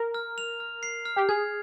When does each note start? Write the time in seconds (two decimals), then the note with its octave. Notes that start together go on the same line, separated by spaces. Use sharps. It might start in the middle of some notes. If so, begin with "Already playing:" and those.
Already playing: A#4
0.14 F6
0.38 F7
0.60 F6
0.83 C7
1.05 F6
1.16 G4
1.29 G#4 G#6